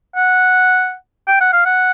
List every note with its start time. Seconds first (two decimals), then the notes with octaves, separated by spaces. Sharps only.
0.16 F#5
1.27 G5
1.40 F#5
1.53 F5
1.65 F#5